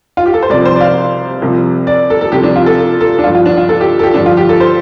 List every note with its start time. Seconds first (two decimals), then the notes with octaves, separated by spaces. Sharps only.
0.17 F4
0.26 G4
0.34 A4
0.42 C5
0.49 C2 C3 F3 D5
0.65 C5
0.76 D5
0.81 F5
1.42 C2 C3 F3
1.87 D5
2.10 A4
2.21 A4
2.32 C2 C3 F3 G4
2.43 D4
2.56 F4
2.66 A4
3.01 A4
3.19 D4
3.23 F3 F4
3.27 G2
3.35 F4
3.46 D4
3.57 F4
3.69 A4
3.80 G4
3.99 A4
4.03 G4
4.14 G2 D3 F3 D4
4.26 F4
4.37 G4
4.49 A4
4.60 C5